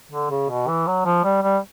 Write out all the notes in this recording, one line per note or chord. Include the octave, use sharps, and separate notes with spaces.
D3
C#3
B2
E3
F#3
F3
G3
G3